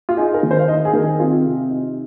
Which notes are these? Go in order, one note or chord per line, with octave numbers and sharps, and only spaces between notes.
F4
D#4 G#4
A#4
D#3
C5
F5
D#4 D#5
G#4
D#3 A#4
G#4
C4 F4
C3
D#4